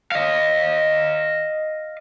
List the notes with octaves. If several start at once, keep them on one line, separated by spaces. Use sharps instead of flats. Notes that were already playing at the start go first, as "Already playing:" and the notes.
D#5 F5